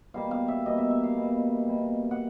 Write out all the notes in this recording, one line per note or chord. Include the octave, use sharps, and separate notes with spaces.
B2 G3 A#3 F5
F5
E5
B2 G3 A#3 D#5
E5
E5
F5
B2 G3 A#3
B2 G3 A#3
F#5